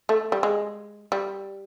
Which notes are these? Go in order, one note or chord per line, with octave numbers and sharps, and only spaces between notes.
A3
G3
G#3
G3